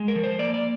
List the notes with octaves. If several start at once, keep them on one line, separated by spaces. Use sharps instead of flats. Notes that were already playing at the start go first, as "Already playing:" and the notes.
Already playing: G#3
A#4
F3
C5
A#3 D5
D5